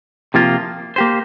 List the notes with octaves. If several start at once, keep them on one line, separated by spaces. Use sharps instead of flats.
C3 F3 A#3 F4
A#3 G4 C5